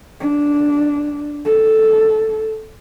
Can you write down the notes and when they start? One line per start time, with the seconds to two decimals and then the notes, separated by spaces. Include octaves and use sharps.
0.21 D4
1.45 A4